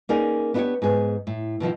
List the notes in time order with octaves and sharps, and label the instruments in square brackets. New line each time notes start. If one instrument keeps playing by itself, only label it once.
[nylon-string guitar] A#3 C#4 D#4 G#4 A#4 D5
B3 D4 E4 F#4 G4 C#5
G#2 B3 G#4
A2
B2 D#3 F3 E4